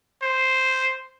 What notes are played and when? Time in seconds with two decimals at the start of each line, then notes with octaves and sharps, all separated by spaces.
0.22 C5